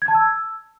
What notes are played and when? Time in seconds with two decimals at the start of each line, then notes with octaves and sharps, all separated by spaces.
0.02 G#6
0.08 A5
0.15 E6